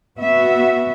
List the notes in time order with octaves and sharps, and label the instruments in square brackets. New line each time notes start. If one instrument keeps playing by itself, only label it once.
[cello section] B3 F#4 E5